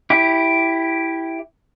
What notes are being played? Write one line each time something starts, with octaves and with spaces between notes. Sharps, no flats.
E4 G4